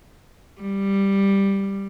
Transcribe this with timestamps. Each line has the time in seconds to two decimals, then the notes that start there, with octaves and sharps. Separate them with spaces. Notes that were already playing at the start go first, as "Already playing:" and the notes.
0.61 G3